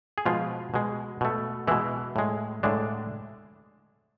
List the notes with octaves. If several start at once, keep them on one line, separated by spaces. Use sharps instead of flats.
G#4
B2 F3 G#3 F4
B2 G#3
B2 A3
B2 E3 G#3 E4
A2 G#3
A2 D3 G#3 D4